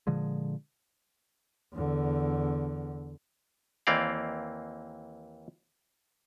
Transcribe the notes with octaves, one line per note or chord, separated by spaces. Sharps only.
A#2 D3 F3 G#3
E2 D3
D#2 E3 A#3 C4 D5 F5